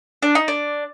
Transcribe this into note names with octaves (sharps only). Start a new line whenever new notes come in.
D4
D#4
D4